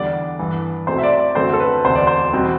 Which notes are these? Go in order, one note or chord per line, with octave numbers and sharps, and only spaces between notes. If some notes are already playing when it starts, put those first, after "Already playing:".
Already playing: E2 D3 G3 D5
G2 E3 B3
C2 B2 A3 C4 C5
E5
D5
D5
F#2 D3 F#3 A3 C4 C5
A4
B4
E1 D2 C3 C5
D5
C5
E2 B2 G3 C4